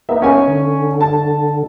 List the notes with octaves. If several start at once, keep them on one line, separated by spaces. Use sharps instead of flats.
A#3 B3 D#4 E5
C#4 G#5
D3
A5